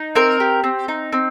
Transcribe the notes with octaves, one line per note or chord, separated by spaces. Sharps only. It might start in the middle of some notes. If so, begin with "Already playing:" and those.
Already playing: D#4
C4 A#4
G4
C4
D#4
C4